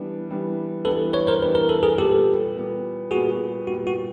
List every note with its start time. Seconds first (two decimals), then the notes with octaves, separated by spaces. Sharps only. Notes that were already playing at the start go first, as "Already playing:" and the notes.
Already playing: E3 G3 B3 D4
0.29 E3 G3 B3 D4
0.85 E3 G3 B3 D4 A4 B4
1.13 B4 C#5
1.27 A#4 C5
1.42 E3 G3 B3 D4 B4
1.55 A#4
1.69 A4
1.83 G#4 A#4
1.98 A#2 G3 B3 G4 A4
2.55 A#2 G3 B3
3.11 A#2 G3 B3 F#4 G#4
3.67 A#2 G3 B3 F#4
3.87 F#4